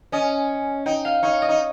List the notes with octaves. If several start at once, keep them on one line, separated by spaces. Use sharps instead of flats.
C#4 D#5
D#4 G5
F5
D#4 C#5
D#5
D#4